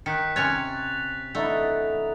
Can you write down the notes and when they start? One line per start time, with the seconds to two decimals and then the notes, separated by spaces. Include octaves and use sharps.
0.06 D#3 F#6 B6 C#7
0.36 C3 C#4 C#5 F#6 A6 F7
1.35 D3 E3 A3 D#4